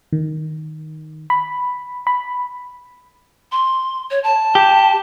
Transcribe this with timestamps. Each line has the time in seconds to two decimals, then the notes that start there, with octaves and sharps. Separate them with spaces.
0.13 D#3
1.30 B5
2.07 B5
3.52 C6
4.11 C#5
4.24 A5
4.55 G4